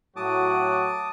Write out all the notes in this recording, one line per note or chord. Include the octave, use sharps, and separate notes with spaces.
A2 F#3 F#4 A5 D6 D#6